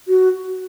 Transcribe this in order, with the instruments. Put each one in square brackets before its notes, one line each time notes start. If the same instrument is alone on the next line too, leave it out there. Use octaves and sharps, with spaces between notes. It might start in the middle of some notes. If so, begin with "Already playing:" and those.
[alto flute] F#4